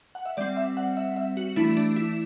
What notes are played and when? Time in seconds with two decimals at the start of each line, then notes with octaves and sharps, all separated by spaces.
0.15 F#5
0.25 E5
0.37 G3 C4 D5
0.56 E5
0.77 F#5
0.97 E5
1.16 E5
1.37 F#4
1.56 E3 A3 D4 E4
1.77 D4
1.96 E4